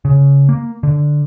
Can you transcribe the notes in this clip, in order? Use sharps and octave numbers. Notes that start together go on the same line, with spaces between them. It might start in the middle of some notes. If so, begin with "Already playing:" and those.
C#3
A#3
D3